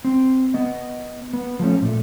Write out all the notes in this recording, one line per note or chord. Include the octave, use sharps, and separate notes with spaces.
C4
B3 D#5
B3
F3 A3 C#4
A#2 A3